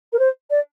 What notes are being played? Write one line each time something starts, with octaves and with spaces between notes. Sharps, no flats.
A#4
C5
D5